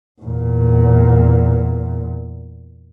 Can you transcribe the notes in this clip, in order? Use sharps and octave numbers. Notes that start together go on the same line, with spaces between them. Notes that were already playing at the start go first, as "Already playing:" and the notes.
E2 A#2